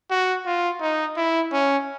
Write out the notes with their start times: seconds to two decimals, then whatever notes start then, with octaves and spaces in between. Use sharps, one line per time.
0.11 F#4
0.46 F4
0.81 D#4
1.17 E4
1.53 C#4